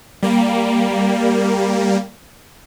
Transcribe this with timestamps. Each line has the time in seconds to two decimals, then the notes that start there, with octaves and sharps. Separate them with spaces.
0.23 G3 A#3